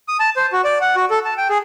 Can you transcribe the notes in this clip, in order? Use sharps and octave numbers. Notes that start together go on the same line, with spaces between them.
D#6
A5
C5
F#4
D5
F#5
F#4
A4
A5
G5
G#4